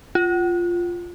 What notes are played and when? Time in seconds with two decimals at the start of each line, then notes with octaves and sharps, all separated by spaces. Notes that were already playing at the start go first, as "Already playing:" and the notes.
0.15 F4